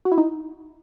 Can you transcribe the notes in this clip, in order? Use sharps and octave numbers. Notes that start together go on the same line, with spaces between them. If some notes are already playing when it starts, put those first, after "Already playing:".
F#4
E4
D#4